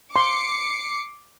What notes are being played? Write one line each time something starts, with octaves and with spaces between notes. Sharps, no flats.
C6 D6 C7 C#7